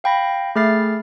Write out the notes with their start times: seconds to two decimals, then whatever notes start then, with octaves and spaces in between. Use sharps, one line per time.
0.04 F5 G5 B5 A#6
0.56 A3 G#4 E5 F6 A6 C7